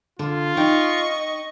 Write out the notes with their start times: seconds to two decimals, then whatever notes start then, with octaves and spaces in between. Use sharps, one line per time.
0.19 D3 F4
0.57 D#4 D#5 G5 C#6